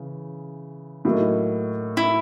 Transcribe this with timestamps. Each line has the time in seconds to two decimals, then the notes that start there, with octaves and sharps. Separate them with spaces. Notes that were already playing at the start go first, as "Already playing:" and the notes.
Already playing: C#3 E3
1.05 A2 F#3 A#3 D#4
1.97 E4